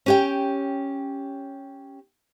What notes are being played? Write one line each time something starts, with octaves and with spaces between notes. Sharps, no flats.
C#4 G4 G5